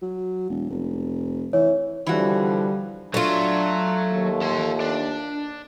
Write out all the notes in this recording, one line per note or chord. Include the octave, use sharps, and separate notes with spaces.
F#3
E1
F1
E3 C#5
D3 E3 F3 G3 F#4
F#3 A3 D4 F4
D#2
A4 C6
D4